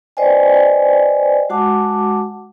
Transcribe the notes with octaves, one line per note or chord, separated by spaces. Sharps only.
B4 C5 D5 D#5 G5 G#5
G#3 F#4 F#5 A5 D6